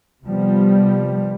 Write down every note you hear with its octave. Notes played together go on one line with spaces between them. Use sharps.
C3 F3 G3 B3